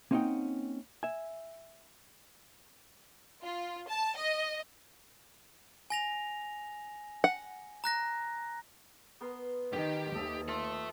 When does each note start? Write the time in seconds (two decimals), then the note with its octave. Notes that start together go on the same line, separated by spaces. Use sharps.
0.11 A#3 C4 C#4 D#4 F#5 G5
1.03 E5 G#5
3.42 F4
3.87 A5
4.16 D#5
5.90 G#5 A#6 F7
7.24 F#5
7.84 A#5 F#6 A#6
9.21 B3 A#4 C6
9.73 D#3 G4
10.15 D#2 A4 D#5 E5
10.48 F4 A4 E5